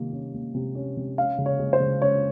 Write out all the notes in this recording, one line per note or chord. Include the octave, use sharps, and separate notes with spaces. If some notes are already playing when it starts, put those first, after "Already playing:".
Already playing: C3 D#3 A#3
C#4
A#3
C3
C#4
C3
C#4 F5
C#3
C#5
G#3
C5
C#3
C#4 C#5